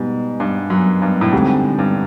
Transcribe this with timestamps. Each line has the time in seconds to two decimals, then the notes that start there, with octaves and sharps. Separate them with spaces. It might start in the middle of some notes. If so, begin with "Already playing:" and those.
Already playing: G#2 B2 G3 B3
0.40 G2
0.70 F#2
1.02 G2
1.21 A2
1.32 G#2 D3 G3 C4
1.79 G2